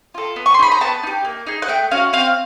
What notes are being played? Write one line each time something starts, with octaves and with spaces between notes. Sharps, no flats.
F4 A4
B3
C#6
C6
D#4 G#4 B5
A#5
B3 A5
D#4 G4
A#3
D#4 G#4
F#5
A3 G5
C#4 F#4 F5
C4 F5